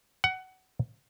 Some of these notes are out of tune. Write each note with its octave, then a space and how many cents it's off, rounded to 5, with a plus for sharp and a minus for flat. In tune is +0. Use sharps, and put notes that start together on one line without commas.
F#5 +20